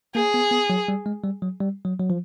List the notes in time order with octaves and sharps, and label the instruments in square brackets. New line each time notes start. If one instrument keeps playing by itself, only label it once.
[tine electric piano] A#3 [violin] G#4
[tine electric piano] B3
B3
F#3
G3
G#3
G3
F#3
G3
F#3
F#3
F3